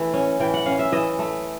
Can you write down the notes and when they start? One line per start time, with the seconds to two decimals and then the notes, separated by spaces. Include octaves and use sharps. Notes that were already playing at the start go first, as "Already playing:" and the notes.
Already playing: E3 A3
0.14 C#4
0.40 E3 G5
0.54 F#5
0.66 C#4 F5
0.79 E5
0.92 E3 D#5
1.19 A3